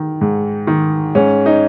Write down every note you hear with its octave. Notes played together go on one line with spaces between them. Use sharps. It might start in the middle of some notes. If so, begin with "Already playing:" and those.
Already playing: D#3
G#2
D#3
G#2 C#4
D#4